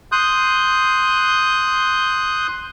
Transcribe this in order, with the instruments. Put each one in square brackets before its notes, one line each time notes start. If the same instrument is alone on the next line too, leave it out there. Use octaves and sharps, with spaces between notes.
[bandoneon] C6 D#6 F#6 G6